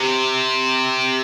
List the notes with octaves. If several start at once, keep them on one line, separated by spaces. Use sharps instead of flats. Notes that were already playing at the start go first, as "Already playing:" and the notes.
Already playing: C3